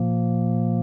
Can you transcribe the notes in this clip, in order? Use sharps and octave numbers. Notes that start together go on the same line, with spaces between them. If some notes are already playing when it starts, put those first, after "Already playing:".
Already playing: A#2 F3 A#3